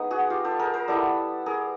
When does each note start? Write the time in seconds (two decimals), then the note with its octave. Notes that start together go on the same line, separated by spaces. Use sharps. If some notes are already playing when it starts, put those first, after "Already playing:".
Already playing: G#3 B3 D#4
0.11 F#4 G#4
0.30 F4 G4
0.45 G4 A4
0.59 G#4 A#4
0.74 A#4 C5
0.88 G3 B3 E4 A4 B4
1.46 G#4 A#4